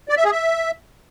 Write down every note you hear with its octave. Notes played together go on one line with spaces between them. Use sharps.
D5
E5
G#4
E5